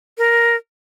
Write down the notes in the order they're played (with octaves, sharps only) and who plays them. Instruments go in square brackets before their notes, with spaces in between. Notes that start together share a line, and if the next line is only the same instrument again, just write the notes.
[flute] A#4